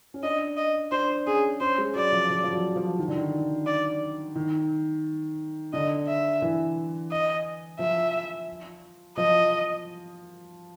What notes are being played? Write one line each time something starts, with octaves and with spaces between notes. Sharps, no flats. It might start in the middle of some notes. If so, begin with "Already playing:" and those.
C#4
D4 D#5
D#5
D4 C5
C#4 G#4
C#4 C5
G#3
F#3 D5
F3
F3
F3
F#3
F3
D#3
D3
D#3
D5
D#3
D3 D#5
E5
E3
D#5
F3 E5
F3 D#5